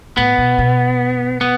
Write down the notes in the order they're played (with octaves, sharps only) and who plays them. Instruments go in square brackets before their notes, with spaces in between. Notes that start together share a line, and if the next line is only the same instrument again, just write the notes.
[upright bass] A2 [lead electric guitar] B3
[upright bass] B2
B2
[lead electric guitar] B3